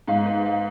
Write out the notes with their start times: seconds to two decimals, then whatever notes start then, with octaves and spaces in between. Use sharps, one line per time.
0.08 G#2 F5
0.26 B4
0.46 F5